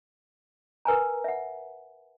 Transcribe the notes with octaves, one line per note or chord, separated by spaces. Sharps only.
A#4 B4 G#5 A#5
E5 F#5